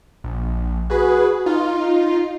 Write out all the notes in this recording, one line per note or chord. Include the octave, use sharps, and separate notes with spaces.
A#1
F#4 G#4 B4
D#4 F4